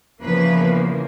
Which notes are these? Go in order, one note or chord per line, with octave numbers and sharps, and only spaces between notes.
E2 C#3 F3 A#3 B4